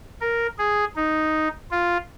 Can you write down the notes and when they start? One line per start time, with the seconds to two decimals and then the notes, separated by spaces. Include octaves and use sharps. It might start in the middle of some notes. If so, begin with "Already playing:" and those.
0.21 A#4
0.58 G#4
0.96 D#4
1.71 F4